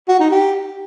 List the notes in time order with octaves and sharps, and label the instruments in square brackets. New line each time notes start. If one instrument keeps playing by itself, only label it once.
[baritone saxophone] F#4
D#4
G4